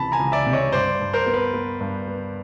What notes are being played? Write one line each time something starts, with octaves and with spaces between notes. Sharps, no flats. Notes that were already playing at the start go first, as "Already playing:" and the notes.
Already playing: C#2 C3 E3 A5 B5
G#5 A#5
C#2
D5 E5
C3
C#5 D#5
G2 C5 D5
G2
A#4 C5
B3
B4
B3
G2
B3